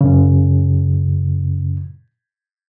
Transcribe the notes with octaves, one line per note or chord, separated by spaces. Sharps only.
F#2 C#3